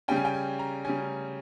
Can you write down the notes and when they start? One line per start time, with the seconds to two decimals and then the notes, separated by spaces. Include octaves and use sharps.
0.08 C#3 G3 C#4 G5
0.16 G#5
0.25 G5
0.34 G#5
0.59 A#5
0.85 C#3 G3 C#4 G#5